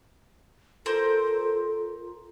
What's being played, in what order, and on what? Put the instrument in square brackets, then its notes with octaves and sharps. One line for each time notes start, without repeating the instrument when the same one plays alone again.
[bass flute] F4 [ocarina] A4 [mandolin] A#4 C5